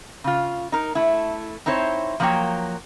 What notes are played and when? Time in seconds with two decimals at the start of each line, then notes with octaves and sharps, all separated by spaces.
0.24 C#3 F4
0.72 D#4 A#4
0.95 A3 E4
1.66 C4 D#4 E4 C5 C#5
2.20 F3 F#3 A3 A#3 C#5 G5